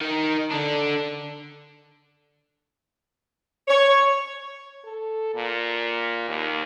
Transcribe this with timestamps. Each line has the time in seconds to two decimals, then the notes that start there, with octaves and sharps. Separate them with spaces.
0.01 D#3 D#4
0.51 D3 D4
3.68 C#5
4.84 A4
5.35 A#2
6.29 D#2